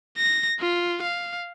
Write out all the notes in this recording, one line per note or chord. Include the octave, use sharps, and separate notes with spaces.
A#6
F4
F5